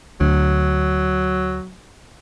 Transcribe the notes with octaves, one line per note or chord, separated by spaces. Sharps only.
D2 F#3